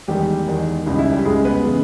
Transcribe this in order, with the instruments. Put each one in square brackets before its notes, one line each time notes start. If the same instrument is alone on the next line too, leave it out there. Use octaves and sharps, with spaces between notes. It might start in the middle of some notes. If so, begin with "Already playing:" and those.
[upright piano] E2 D#3 G3 G#3 G4
E2 D#3 G#3
C#2 C#3 G3 D#4
E4
G3 G4
C#2 C#3 G3 G#3 G#4
B3 B4
C#3 E3 G#3